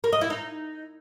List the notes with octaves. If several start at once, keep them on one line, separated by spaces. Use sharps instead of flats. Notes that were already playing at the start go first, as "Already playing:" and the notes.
A#4
D#5
E4
D#4